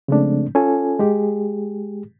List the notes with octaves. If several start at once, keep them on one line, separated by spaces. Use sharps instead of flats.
C#3 F3 G#3 A3 C4 D4
C#4 F4 A4 G#5
G#3 G4 G#4